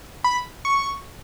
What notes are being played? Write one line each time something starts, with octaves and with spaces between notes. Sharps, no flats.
B5
C#6